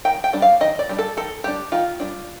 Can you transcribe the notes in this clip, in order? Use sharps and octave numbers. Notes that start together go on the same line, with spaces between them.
D#3 G5
G5
G3 D4
F5
D#3 D#5
D5
G3 D4
A4
D#3 A4
G3 D4 G4
D#3 F4
G3 D4